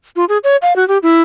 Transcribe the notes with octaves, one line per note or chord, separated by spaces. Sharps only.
F4
G#4
C#5
F5
F#4
G4
E4